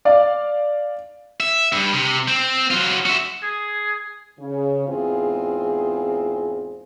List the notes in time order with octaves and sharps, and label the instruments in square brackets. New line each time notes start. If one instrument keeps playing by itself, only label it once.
[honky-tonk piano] D5 F5
[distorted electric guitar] E5
G2
C3
C4
F#3 F4
F#4 E5
[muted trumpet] G#4
[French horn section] C#3
E2 G#2 C4 F4 G#4